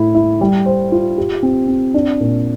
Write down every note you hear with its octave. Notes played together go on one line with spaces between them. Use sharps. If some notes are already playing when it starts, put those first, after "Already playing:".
Already playing: A2 E4
E4
G3
C5
F4
G4
C4
C4
D4
A#2